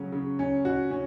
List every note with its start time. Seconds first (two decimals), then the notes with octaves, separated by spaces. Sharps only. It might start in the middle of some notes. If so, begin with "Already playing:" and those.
Already playing: C#3 F#3 C#4
0.12 C#3
0.39 C#4
0.65 F#4
0.91 C#4